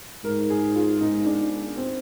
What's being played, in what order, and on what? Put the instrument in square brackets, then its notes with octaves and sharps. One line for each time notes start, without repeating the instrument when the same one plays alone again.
[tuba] G#2 [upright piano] A#4
[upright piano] G#4
F4
D#4
D4
C4